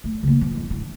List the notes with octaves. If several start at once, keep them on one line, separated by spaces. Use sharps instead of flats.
A3
C#3 A#3
E3 F3
E2 G#2
D4 E4